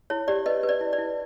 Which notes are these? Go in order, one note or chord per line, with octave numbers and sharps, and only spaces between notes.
E4 C#5
G4 D5
B4 D#5
B4
D5
E4
D5
E4